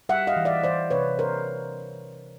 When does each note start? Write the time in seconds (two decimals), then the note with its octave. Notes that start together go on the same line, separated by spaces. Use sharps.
0.09 G3 E5 F#5
0.27 D#5 F5
0.36 E3
0.45 D5 E5
0.63 E3 C5 D5
0.90 C3 B4 C#5
1.19 D4 A#4 C5